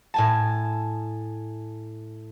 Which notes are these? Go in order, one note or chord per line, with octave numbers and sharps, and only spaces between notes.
A2 G#5 A5